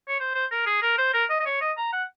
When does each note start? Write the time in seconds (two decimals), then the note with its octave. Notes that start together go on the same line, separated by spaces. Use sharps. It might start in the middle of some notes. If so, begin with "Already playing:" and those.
0.08 C#5
0.20 C5
0.35 C5
0.52 A#4
0.66 G#4
0.82 A#4
0.98 C5
1.14 A#4
1.30 D#5
1.40 D#5
1.46 C#5
1.61 D#5
1.77 A#5
1.93 F#5